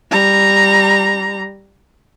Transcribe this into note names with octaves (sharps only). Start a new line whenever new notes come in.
G3 A#5